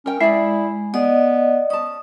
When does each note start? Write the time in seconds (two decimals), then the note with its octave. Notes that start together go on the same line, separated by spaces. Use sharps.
0.06 C#4 A#4 G5
0.21 G#3 E4 G#4 D5 E5
0.94 B3 G#4 D5 D#5
1.70 C#4 A5 D#6